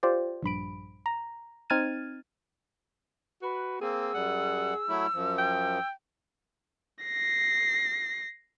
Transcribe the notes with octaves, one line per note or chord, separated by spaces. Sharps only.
F4 G4 C5 D5
A#1 G2 B5 D7
A#5
C4 D#4 F6 G#6 A6 D#7
F#4 B4
A#3 C4 G#4 E6
F#2 G3 F#5
F#3 A3 E4
F#2 F3
G5
A#6 C7